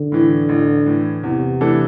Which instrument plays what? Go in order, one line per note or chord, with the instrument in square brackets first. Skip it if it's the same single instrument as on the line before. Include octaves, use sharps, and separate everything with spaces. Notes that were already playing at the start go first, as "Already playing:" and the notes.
Already playing: [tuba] D3
[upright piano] A2 E3
A1
A2 E3
[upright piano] E2 [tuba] C3
[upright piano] E3 A3 D4 A4